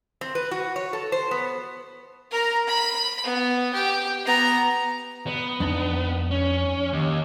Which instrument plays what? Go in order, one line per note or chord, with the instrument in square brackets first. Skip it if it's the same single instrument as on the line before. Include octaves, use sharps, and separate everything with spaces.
[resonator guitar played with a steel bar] C4
B4
F#4
C#5
A4
C5
B3
[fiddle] A#4 A#5
B5
B3
G4
B3 A#5
[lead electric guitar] B3
[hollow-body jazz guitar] F2 D4 D#4
[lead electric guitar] C#4
D#2